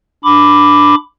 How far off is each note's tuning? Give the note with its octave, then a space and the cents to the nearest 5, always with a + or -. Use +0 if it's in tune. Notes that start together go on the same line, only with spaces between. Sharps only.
D4 +0 B5 +10 D6 +0